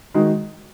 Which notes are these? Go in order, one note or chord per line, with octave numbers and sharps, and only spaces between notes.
D#3 G#3 D#4 F#4